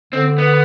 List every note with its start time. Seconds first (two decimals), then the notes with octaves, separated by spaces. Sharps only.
0.13 D3 C4
0.38 B3